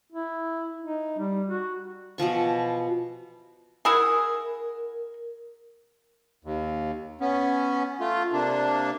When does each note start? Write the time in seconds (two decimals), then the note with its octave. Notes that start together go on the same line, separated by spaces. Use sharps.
0.12 E4
0.81 D#4
1.19 G3
1.47 F#4
2.18 B2 E3 F3 C#6
3.85 E4 F#4 G#4 A#4
6.44 D#2
7.21 B3 C#4
8.00 A3 F4
8.33 C3 A#3 D4